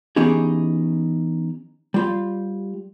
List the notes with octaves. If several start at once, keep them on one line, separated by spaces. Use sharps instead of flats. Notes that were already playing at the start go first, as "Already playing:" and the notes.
E3 B3 C#4 D#4 G4 G#4
G3 F4